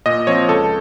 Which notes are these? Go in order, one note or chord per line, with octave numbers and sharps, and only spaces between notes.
A#2 D#5
F3 C4 C#5
C#2 A4